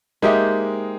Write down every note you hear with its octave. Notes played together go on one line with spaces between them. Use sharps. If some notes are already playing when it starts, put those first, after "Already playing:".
G#3 A#3 D#4 G4 C5 E5